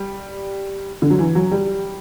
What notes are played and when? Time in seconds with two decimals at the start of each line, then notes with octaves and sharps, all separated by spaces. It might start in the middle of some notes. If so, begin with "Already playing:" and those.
Already playing: G3
1.02 D3
1.10 F#3
1.19 E3
1.35 F#3
1.52 G3